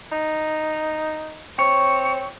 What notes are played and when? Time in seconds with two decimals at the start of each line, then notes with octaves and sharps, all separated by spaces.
0.12 D#4
1.59 C4 C#5